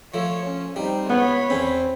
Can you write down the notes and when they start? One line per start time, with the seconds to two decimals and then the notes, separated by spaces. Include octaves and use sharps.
0.14 F3 A3 C#5
0.46 C#4
0.76 G3 C4 D#4
1.10 C#2 B3 C#5 B5
1.50 E2 C4 C#4